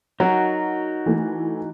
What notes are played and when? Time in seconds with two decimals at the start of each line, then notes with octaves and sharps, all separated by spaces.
0.20 F#3 D#4 F#4 A#4
1.06 E3 A3